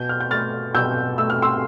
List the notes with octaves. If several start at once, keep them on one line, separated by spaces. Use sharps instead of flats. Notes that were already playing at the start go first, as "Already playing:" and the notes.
Already playing: B2 G6
F6
G6
A3 F6 A6
B2 E6 G6
A3 E6
F6
C6 E6